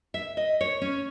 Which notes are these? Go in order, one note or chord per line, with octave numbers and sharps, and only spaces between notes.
E5
D#5
C#5
C#4